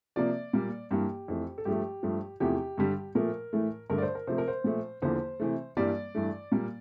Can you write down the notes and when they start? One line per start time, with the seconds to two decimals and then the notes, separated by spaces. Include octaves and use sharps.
0.16 C3 F3 A#3 D5
0.53 A#2 G3 A#3
0.91 G2 E3 A#3 G4
1.28 F2 E3 A3
1.58 A4
1.65 G2 F3 A3 G4
2.03 G2 F3 A3
2.40 E2 C3 F3 A3 G4
2.78 G2 D3 G3
3.15 A#2 F3 A3 A#4
3.53 A2 E3 A3
3.90 G2 D3 A3 A#4
3.98 D5
4.02 C5
4.15 A#4
4.27 C3 F3 A3 C5
4.38 A#4
4.48 C5
4.64 A#2 F3 A3
5.02 E2 D3 F3 A#3 C5
5.40 C3 E3 A3
5.77 G2 E3 G3 A#3 D5
6.15 G2 E3 A3
6.52 A#2 G3 A#3